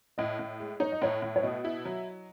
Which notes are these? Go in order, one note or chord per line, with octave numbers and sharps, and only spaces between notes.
A2 D#5
A2
G#3
D#4 C#5
D#5
A2 C#5
A2
C#5
B2 D#5
E4
F#3